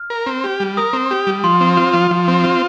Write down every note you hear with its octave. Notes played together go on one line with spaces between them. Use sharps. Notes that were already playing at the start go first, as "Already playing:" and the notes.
Already playing: F6
A#4
C4
G4
G3
A#4 D#6
C4
G4
G3
F3 C6
C4
F4
F3
F3
C4
F4